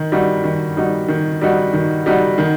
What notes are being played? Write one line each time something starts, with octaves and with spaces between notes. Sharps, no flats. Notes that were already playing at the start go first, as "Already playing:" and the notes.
Already playing: D#3
G3 D#4 F#4
D#3
G3 D#4 F#4
D#3
G3 D#4 F#4
D#3
G3 D#4 F#4
D#3